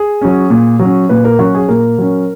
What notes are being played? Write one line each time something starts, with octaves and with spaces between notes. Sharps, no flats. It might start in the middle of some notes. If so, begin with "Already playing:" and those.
Already playing: G#4
F#3 C#4
A#2
F#3
C#4
A#2 B4
A#4
F#3 C#4 F#4
G#4
A#2 A#4
F#3 C#4